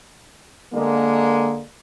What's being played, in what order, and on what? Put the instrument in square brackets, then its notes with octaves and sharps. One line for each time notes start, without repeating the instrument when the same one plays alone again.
[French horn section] D3 G#3 A#3